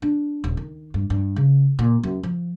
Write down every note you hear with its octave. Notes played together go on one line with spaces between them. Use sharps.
D4
D#1
D#3
G2
G2
C#3
A#2
F#2
F3